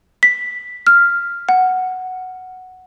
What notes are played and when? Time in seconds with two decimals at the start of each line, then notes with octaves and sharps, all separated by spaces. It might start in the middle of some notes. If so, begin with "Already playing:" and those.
0.23 B6
0.87 F6
1.49 F#5